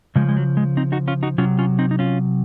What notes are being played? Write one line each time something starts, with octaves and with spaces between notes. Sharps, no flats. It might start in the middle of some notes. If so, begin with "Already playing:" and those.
C#3 F3 G#3
G#3
F#3
G#3
C4 D#4
D#4 F#4
C#4 F4
D#4 F#4
C3 F#3 C#4 F4
C#4 F4
C4 D#4
D#4
C#4 F4